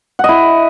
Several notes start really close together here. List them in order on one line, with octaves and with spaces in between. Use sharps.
F#5 D#5 E4